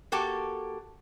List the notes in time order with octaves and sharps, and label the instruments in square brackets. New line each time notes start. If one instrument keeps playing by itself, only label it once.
[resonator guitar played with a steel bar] A#3 F#4 G4 A4 A5